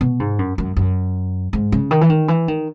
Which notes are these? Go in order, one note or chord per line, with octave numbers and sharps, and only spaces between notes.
B2
G#2
F#2
F#2
F#2
G#2
C#3
D#3
E3
D#3
E3
D#3